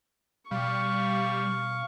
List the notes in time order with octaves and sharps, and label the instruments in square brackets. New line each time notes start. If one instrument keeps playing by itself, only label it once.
[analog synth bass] B2 [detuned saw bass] G3 [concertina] F5 [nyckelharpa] C#6